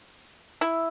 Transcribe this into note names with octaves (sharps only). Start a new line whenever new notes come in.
E4